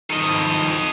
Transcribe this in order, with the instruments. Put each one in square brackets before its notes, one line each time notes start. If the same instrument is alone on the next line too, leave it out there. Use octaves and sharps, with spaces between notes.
[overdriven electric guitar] D#3 F3 [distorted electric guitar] A4 D#5 [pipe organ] D#6